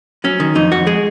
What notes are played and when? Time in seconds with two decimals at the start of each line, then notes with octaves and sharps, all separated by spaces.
0.24 F#3 C#4
0.40 D#3
0.55 F2 D#4
0.71 F2 F#4
0.87 G#3 G#4